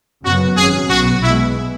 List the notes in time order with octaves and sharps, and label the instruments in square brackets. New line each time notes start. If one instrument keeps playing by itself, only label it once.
[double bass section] F#2 C#3 F#3 B3 [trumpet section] F#4
[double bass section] G#1 F#2 F#3 C#4 [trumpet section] G#4
[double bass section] B1 B2 B3 [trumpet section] F#4
[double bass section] B1 B2 G#3 B3 [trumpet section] E4